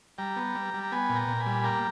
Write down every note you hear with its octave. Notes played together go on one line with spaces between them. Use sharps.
G3 G5 A#5
B3
G3
G3
A#5
B3 G#5 B5
A#2
G5 A#5
A#2
G#5 B5
G3
A#3 G5 A#5